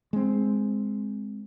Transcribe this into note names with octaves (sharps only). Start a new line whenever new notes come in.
G#3 C4